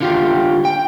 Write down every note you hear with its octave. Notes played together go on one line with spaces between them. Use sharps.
D3 F4 G4
G5